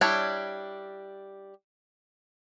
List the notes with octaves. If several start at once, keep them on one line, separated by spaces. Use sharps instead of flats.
G3 D4 E4 C#5